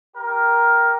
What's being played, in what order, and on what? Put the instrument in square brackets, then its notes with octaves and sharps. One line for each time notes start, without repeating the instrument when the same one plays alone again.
[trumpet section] G4 A#4